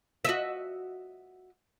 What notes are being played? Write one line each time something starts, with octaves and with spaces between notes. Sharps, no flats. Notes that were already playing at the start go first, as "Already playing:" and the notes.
F#4 D#5 E5